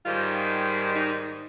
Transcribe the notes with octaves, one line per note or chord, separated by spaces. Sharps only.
G#2 D#3 G3 F4
D#4